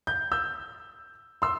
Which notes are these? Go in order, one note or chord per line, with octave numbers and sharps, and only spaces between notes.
G6
E6 G6
C6 E6